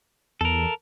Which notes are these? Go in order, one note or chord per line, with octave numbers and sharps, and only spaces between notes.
E2 A4 A#4